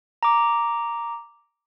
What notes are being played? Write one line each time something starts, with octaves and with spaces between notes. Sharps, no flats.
A#5 D6